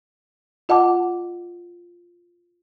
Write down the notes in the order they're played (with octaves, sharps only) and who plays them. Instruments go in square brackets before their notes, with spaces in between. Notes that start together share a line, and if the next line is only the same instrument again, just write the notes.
[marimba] F4 D#5 F#5 A5 D6